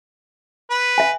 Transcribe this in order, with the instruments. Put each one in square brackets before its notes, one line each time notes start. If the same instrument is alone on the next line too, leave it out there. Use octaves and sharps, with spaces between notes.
[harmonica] B4
[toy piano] E5 G#5